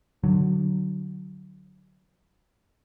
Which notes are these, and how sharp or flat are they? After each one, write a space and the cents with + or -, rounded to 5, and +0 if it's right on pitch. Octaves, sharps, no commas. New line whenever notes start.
D3 +20 F#3 +10